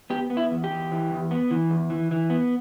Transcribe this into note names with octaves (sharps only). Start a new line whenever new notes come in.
B3 G4
B3
E4
E2
G4
E2
E3
E2
B3
E3
E2
E3
E3
B3